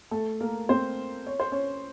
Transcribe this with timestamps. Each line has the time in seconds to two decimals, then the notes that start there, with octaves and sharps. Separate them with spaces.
0.11 A3 A4
0.40 A#3 A#4
0.69 C4 C5
1.27 C#5
1.40 C5
1.52 C#4 C#5